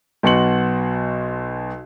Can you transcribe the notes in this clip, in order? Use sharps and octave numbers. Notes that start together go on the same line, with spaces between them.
B1 B2 F#4 C6 C#7 F#7